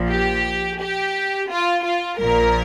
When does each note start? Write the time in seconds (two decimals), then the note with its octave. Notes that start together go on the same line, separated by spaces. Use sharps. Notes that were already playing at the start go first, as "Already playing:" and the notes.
Already playing: A#1 A#2 F3
0.09 G4
0.80 G4
1.50 F4
1.84 F4
2.18 A#1 A#2 F3 A#4